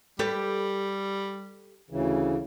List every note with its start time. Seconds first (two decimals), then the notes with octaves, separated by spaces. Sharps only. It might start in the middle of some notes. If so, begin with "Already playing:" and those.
0.19 G3 G4 A4 B4
1.90 D2 C#3 E3